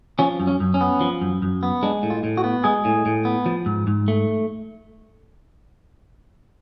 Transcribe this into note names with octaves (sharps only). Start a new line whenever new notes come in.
F3 C#4
F#2
C#4
F#2
C#4
B3
F3
F#2
F#2
B3
G#3 D4
A2
F4
A2
F#4
B3
G#3 G#4
A2
A2
B3
F3
G#2
G#2
A3